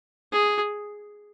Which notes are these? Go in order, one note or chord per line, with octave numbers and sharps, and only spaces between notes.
G#4